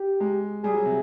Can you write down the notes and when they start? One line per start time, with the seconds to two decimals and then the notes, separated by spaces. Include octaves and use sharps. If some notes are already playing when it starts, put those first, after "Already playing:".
Already playing: G4
0.20 G#3
0.63 G3 G#4
0.74 F#3
0.85 C3